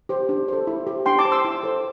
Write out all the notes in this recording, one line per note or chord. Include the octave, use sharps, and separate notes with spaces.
G4 C5
D4
A4 C5
E4
G4 C5
D4 G5 C6
A5 D6
C5
C6 E6
E4
A4 C5